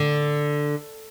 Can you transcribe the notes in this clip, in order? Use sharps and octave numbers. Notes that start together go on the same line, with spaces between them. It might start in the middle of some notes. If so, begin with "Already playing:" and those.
Already playing: D3